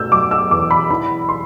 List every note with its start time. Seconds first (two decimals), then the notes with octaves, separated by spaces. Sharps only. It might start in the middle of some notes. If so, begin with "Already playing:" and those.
Already playing: B2 A3 E6 G6
0.12 F#3 D6
0.31 E6
0.51 E2 D6
0.71 B5
0.91 E3 B5
1.29 C6